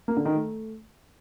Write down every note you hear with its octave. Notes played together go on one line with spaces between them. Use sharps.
A#3
D3
D#3
A3